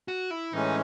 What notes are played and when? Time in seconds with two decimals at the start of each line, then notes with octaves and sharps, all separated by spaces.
0.08 F#4
0.31 E4
0.53 A2 E3 G#3 C#4 D#4